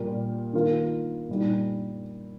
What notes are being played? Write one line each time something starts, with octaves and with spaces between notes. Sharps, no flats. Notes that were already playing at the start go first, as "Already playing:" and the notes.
Already playing: A#2 G3 A#3 G4 A#4
D#3 A#3 F4 A#4
A#2 G3 D#4